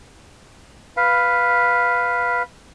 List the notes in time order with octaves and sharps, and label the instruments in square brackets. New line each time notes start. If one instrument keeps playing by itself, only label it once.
[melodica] B4 F5